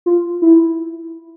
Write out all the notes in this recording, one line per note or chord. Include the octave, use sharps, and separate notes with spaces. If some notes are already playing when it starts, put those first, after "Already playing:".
F4
E4